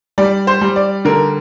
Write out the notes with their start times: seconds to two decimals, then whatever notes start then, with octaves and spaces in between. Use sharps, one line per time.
0.18 G3 D5
0.47 C5
0.61 G3
0.76 D5
1.05 D3 A#4